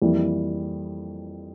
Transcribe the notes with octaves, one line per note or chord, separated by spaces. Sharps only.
F2 E3 G3 A#3 E4